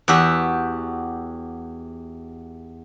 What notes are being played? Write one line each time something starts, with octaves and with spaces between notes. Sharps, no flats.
E2 F#4 G4 E5